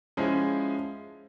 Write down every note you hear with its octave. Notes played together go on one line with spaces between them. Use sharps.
F3 G#3 C#4 E4 G#4